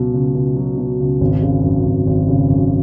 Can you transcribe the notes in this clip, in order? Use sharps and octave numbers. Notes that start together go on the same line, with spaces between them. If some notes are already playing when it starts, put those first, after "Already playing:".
Already playing: C#2 B2 F#3
C#2
C#2
F#3
B2
C#2
G#1
C#3
F#2
G#1
G#1
C#3
F#2